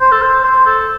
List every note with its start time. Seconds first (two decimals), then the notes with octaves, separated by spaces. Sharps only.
0.01 C5
0.12 A4
0.22 C5
0.44 C5
0.66 A4